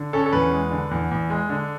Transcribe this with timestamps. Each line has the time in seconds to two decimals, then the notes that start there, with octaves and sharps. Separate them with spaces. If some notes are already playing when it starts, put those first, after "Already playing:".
Already playing: D3
0.13 C#4 A4
0.26 A4
0.33 E2 B4
0.52 G#3
0.71 D3
0.91 E2
1.11 E2
1.30 G#3
1.49 D3